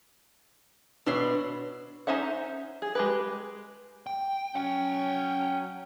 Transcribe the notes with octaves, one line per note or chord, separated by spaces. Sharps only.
B2 D4 C#5 E5 C6
C#4 D#4 C5 E5 F#5
G#4
G#3 G4 B4
G5
F#3 C#4 F#5 G5